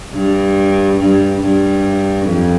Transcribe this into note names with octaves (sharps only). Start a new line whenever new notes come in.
G2
G2
G2
F2